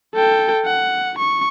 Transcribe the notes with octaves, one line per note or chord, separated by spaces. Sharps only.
A4 G5
F#5
C#6